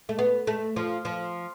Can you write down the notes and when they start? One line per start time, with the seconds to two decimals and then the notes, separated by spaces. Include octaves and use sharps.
0.09 A3
0.19 B3
0.47 A3
0.76 F3
1.05 F3